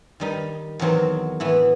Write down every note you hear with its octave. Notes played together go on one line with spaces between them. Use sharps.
D#3 G3 D#4
E2 D#3 F#3 C4 D#4
A2 E3 B3 E4